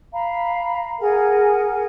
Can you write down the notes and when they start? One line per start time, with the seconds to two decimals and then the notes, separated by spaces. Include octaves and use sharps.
0.13 F5 A#5 B5
1.01 G#4 A#4 F#5 G#5